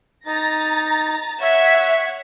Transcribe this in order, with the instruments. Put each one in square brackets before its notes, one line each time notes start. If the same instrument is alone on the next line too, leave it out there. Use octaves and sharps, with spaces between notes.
[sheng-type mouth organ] D#4 [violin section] A#5 A6 A#6
[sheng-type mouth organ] C#5 [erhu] E5 [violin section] F#5 G#6